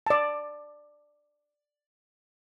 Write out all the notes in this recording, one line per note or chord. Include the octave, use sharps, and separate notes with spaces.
D5 A5